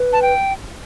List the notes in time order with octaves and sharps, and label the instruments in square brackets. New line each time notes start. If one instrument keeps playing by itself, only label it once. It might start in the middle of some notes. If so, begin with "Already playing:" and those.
Already playing: [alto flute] B4
[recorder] A5
G5